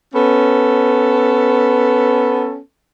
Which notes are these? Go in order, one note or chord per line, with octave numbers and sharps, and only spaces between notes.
B3 C#4 A4